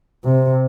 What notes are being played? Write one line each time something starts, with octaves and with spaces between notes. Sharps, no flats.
C3